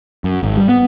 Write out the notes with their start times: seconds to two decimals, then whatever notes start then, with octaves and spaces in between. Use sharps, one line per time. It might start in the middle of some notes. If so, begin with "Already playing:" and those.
0.24 F#2
0.43 G#1
0.57 G3
0.69 B3